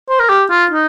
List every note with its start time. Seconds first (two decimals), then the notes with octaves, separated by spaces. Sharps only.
0.09 C5
0.20 A#4
0.29 G4
0.50 F4
0.71 D#4